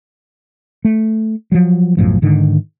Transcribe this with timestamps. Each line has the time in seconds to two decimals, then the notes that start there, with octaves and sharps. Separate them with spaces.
0.85 A3
1.52 F3 F#3
1.97 B1 F#2 A2 F3
2.22 G#2 D3 D#3